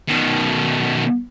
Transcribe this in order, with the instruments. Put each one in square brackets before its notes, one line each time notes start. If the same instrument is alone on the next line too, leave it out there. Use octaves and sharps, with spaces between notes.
[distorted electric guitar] B2 D#3